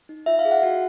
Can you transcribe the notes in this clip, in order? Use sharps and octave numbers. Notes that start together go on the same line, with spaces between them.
D#4
F4 E5
F5
G#4
F#5
F#4